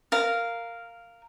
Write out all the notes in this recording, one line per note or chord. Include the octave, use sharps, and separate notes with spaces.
A#4 F5